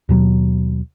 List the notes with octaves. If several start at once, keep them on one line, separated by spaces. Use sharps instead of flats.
D#2 B2 F#3